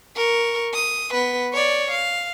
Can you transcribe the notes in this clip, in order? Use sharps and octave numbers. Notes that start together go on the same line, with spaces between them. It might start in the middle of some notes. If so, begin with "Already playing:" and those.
A#4 C#6
D#6
B3 B4
C#5 D5
F5